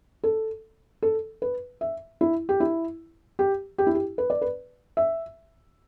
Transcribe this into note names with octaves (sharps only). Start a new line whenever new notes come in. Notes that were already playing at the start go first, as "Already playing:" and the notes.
A4
A4
B4
E5
E4
G4
E4
G4
G4
E4
G4
B4
D5
B4
E5